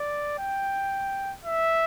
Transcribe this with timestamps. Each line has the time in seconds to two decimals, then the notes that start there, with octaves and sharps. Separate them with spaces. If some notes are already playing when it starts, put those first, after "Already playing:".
Already playing: D5
0.39 G5
1.45 E5